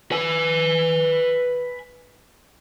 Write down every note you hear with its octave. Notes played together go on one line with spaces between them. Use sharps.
B4 G#5